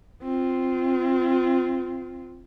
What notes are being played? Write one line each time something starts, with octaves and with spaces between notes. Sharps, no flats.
C4 F4